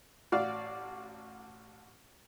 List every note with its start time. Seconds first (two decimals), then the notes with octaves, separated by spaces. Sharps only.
0.32 A1 F#4 D5 F5 F6